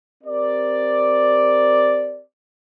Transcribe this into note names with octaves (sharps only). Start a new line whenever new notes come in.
C4 G4 A#4 D5